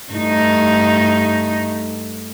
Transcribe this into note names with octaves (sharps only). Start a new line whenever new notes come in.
G2 A3 D#4